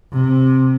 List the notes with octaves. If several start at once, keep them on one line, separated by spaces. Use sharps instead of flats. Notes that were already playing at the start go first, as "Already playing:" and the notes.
C3